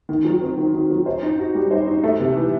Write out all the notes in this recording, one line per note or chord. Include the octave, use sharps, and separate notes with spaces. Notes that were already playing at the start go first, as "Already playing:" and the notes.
D#3
F#3
C4
D#3
D#3
F#3
C5
D#4
F#4
G3
C5
D#4
A3
C3
E3